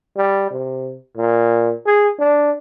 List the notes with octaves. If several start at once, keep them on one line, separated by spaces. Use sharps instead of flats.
G3
C3
A#2
G#4
D4